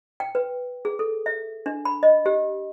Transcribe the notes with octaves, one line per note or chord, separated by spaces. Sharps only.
G5
B4
G#4
A4
E5
D4
B5
D#5
G4